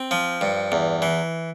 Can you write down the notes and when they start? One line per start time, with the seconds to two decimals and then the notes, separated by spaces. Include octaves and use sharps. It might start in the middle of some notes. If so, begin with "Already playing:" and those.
Already playing: C4
0.11 F3
0.41 G2
0.72 E2
1.02 E3